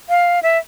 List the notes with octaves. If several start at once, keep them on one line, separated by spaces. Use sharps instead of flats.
F5
E5